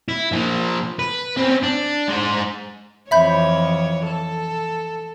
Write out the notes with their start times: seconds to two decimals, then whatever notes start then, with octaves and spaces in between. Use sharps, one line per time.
0.09 E4
0.32 A#2 F3
0.99 B4
1.37 C4 C#4
1.63 D4
2.08 G#3 C5
3.11 F2 E3 C#5 E5 B5 G6
4.06 A4